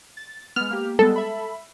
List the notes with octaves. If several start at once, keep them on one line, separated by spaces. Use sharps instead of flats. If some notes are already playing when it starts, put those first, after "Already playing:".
A6
G#3 B3 F6
A#3 G4
G3 G#3 B3 A4
E5 B5